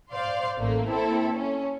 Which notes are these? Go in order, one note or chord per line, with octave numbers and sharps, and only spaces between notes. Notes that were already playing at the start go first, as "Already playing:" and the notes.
C5 D5 F5 C6
A1 A3 A#3
A#3 C4 E4 A4
C#4